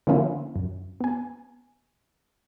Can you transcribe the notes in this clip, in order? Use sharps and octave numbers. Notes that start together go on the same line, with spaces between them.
D3 F3 A#3 C#4 E4 F4
F#2
B3 G#5